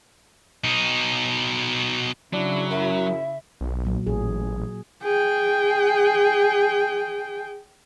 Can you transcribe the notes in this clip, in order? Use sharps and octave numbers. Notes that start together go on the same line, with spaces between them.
B2 D#4
C#3 F#3 D4 E4
F#2 E5
B1
A#2 F#3
A1 G#4
G#4 G5